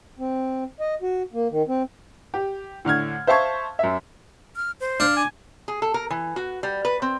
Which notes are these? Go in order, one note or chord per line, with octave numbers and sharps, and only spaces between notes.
C4
D#5
F#4
A#3
D#3
C4
G4
A2 D3 F6 G#6
C5 E5 F5 A5 C#6 G#6
F#2 E5
F6
C5
D4 F5
G#5 D6
G#4
A4
A#4
E3
F#4
G3
B4
C4